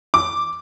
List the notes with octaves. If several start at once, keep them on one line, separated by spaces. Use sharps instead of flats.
D6